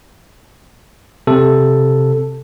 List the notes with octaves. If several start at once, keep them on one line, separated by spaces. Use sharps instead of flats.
C3 A4